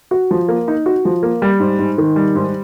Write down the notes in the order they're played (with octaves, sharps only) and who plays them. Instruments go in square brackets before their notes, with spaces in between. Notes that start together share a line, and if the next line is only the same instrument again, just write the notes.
[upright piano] F#4
F3
A#3
D#4
F#4
F3
A#3
G3
G#2
G#2
D#3
G3
G#2